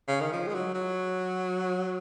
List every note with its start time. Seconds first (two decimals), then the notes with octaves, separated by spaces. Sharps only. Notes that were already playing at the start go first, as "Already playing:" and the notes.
0.08 C#3
0.21 D#3
0.33 F3
0.47 G#3
0.54 F#3
0.74 F#3